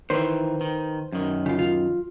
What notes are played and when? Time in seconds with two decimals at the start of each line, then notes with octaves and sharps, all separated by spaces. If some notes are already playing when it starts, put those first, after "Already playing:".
0.10 D#3 E3 B4 C5
0.61 D#3
1.12 F#2 D#3
1.46 C#3 F4
1.59 F4